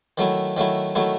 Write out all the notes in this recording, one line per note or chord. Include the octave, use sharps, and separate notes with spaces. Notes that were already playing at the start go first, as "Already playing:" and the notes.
D#3 F#3 A3 E4
D#3 F#3 A3 E4
D#3 F#3 A3 E4